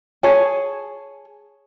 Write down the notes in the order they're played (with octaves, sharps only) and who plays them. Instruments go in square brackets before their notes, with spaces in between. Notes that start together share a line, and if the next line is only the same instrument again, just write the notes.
[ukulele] G#4 C#5 G#5 A5